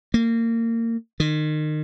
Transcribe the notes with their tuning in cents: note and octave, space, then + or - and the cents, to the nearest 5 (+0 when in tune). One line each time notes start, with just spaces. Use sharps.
A#3 -25
D#3 -30